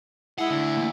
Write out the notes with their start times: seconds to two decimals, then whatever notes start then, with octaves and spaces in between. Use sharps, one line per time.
0.38 E4 G#4 D#5 F#5
0.50 D2 D3
0.77 E3 A#3